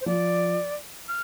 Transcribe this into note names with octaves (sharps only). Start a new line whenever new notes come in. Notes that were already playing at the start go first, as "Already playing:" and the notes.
C5
F3 D5
F6